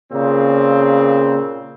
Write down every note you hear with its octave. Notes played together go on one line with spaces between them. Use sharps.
A#2 C#3 C4